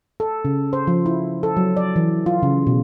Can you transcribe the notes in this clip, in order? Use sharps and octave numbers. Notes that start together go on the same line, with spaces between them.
A4
C#3
C5
F3
E4
A4
F#3
D5
E3
F4
C#3
B2